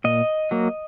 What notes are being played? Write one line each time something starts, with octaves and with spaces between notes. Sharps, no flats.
A#2 D#5
F#3 A#3